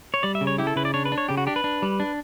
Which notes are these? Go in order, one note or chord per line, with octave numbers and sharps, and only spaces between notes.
C#5
G3 D5
E5
C#3
C#5
E4 G4
A4
C#3 B4
D5
D4 C#5
B4
D4
C#5
C#3 G4
F#4
D4 G4
B4
D4
G3
D4